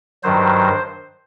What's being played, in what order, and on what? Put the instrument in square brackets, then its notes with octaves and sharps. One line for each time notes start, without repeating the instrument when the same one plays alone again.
[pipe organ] G2 D#3 F#3 C5